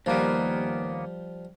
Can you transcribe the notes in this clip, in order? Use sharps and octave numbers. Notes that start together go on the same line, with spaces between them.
D#2 F3 G3 A#3 B3